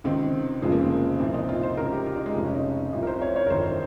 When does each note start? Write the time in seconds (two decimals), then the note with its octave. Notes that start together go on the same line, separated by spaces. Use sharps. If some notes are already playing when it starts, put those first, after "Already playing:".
0.04 C#2 C3 D#3 C4
0.62 F1 F2 C#3 F3 G#3
0.72 A#3
0.81 C4
1.20 C2 A#2 F3 C4
1.34 D#4
1.49 F4
1.63 C5
1.77 C#2 C#3 F3 A#4
1.92 G4
2.06 F4
2.16 D#4
2.26 G#3
2.35 F1 F2 C3
2.44 C#4
2.55 D#4
2.93 C2 C3 F3 F4
3.03 A#4
3.07 C5
3.22 C#5
3.36 C#5
3.46 A#4
3.50 G1 F2 D#3 C5